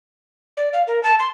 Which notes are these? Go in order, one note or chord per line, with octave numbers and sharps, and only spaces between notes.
D5
F5
A#4
A5
C6